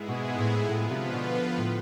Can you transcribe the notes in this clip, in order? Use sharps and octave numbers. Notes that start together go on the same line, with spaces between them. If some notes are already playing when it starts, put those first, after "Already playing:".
Already playing: G#2 G#3 B3 E4 G#4
B2
A2
A2 D3 F3 B3 F4 B4
C3
B2
A2